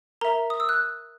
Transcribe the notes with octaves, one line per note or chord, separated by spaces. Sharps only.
A#4 E5 A#5
D#6
E6
F#6